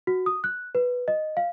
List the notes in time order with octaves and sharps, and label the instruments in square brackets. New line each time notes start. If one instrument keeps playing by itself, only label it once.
[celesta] F#4
D#6
F#6
B4
D#5
F5